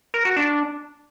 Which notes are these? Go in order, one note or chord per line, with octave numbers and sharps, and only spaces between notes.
A#4
F#4
D4